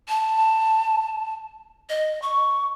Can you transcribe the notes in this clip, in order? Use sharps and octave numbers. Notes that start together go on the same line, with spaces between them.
A5
D#5
C#6